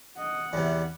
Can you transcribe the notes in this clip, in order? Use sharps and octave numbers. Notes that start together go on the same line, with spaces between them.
D#5 F#5
E2 C3 G3